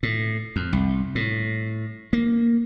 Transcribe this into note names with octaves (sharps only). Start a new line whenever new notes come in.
A2
F2
C2
A2
A#3